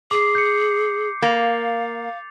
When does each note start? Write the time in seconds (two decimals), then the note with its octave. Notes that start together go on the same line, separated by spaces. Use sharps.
0.11 G#4 D6 C7
0.35 G6 C#7
1.22 A#3 F5 A6 F7